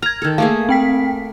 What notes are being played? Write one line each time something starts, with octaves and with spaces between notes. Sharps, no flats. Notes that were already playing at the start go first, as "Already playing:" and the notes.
A#5 F6 G#6
D#3 A4
A3 A#3 G#4 F5
C4 G5 B6